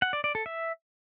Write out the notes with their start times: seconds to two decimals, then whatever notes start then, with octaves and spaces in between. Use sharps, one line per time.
0.02 F#5
0.13 D5
0.24 D5
0.35 A4
0.46 E5